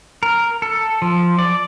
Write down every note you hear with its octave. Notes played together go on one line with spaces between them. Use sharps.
A#4
A4
F3
D5